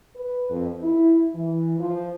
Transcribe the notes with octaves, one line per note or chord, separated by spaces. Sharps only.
B4
F2
E4
E3
F3